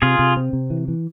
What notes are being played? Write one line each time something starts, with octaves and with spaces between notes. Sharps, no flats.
C3 F4 G#4
C3
C4
C3
E3
E3